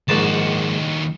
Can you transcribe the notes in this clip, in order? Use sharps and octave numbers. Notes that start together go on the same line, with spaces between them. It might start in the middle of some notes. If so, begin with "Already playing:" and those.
A#1 D#2 G#2 F#4 A5